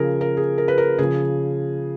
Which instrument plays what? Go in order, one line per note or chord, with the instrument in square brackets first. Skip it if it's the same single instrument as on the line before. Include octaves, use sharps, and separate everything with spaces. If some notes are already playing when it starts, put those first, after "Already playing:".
Already playing: [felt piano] C#3 F3 G#4 A#4
A#4
G#4
A#4
B4
A#4
C#3 F3 G#4